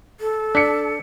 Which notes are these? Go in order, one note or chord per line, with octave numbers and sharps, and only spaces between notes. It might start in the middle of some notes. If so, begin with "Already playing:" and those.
A4
D4 B6 C#7